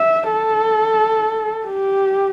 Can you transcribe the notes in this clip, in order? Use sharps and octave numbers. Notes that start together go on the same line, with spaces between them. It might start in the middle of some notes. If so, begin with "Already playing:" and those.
Already playing: E5
A4
G4